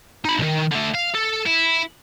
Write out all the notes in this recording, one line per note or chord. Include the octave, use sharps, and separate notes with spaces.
D#4 B5
B1 D#3
D3 A3
F5
A4
E4